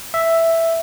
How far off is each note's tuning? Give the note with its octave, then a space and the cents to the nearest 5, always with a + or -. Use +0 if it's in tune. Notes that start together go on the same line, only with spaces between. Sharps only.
E5 +0